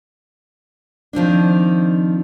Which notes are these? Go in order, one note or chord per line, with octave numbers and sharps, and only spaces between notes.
D#3 F3 C4 D4